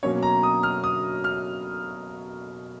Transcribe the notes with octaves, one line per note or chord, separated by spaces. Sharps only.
B2 F#3 A#3 C#4 C#5
A#5
D#6
F6
D#6
F6